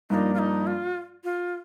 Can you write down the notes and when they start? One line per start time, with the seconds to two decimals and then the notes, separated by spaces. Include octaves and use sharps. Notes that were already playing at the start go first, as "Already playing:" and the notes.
0.10 G2 F3 A#3 D4 D#4
0.34 F4
0.39 D#4
0.67 F4
1.24 F4